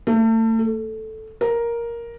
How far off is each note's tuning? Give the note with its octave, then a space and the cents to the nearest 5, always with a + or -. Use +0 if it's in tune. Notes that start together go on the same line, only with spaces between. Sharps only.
A3 +35
A4 -5
A#4 +5